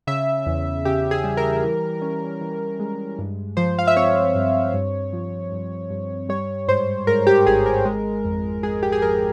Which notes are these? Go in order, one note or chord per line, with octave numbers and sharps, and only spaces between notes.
C#3 E5
E2
C#3 G4
G#4
G3
A#4
E3
C#4
E3
G#3
G2
F3 C5
F5
E5
C4 C#5
G2
G2
F3
G2
G2
G3 C#5
G#2 C5
G#2 A#4
G4
G#1 G#4
A#4
G#3
F2
G#3 G#4
G4
G#4
F2 A#4